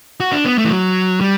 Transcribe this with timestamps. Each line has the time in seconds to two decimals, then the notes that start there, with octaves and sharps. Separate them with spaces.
0.20 F#4
0.32 D4
0.45 B3
0.58 A3
0.65 E3
0.71 F#3
1.21 G3